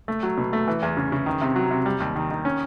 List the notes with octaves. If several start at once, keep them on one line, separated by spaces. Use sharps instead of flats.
A3
F#3
B2
A3
E3
E2
C#3
C#3
D#3
C3
F#3
C3
G3
D#2
D#3
D#3
C#4